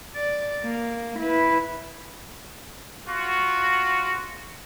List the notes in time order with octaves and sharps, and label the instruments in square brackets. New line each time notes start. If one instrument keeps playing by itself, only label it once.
[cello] D5
A#3
E4 B4
[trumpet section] F4 F#4